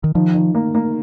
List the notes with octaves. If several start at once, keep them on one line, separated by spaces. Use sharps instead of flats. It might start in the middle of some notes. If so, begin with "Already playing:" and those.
D#3
D#3 F3
D#3
A#3
A#3